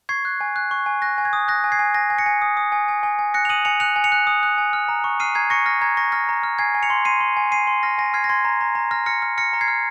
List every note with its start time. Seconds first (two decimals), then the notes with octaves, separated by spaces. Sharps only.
0.09 C#6 G#6 C7
0.25 F#6
0.41 G#5
0.56 F#6
0.71 C#6
0.86 G#5
1.02 F#6 A#6
1.18 G#5
1.25 G#6
1.33 D#6
1.48 F#6 A#6
1.64 G#5
1.72 G#6 C7
1.79 G#5
1.94 G#5 A#6
2.10 G#5
2.18 A#6 C#7
2.26 G#5
2.42 D#6
2.57 D#6
2.72 G#5
2.88 G#5
3.03 G#5
3.19 G#5
3.34 F#6 A#6 C#7
3.45 F7
3.49 D#6 D#7 F#7
3.65 G#5 C#7 F7
3.80 F#6 C#7 F7
3.96 G#5
4.04 C#7 F7
4.12 F#6
4.27 D#6
4.43 F#6
4.58 G#5
4.73 F6
4.89 A#5
5.04 C#6
5.20 F6 C7 D#7
5.35 A#5 G#6 C7
5.50 C#6 A#6 C#7
5.66 F6 A#6
5.81 A#5 G#6
5.97 C#6 A#6
6.12 F6 A#6
6.29 A#5
6.43 F6
6.59 G#5 G#6 C7
6.75 G#5
6.83 C#7 F7
6.90 C6
7.05 C6 C7 D#7
7.21 C6
7.37 G#5
7.52 G#5 C7 D#7
7.67 C6
7.83 F6 A#6
7.98 G#5 A#6
8.14 F6 G#6 C7
8.24 A#6
8.29 C6 G#6
8.45 A#5
8.61 A#5
8.75 A#5
8.91 F6 A#6
9.06 F6 A#6 C#7
9.22 F6
9.38 F6 A#6 C#7
9.53 A#5
9.61 G#6 C7
9.68 F6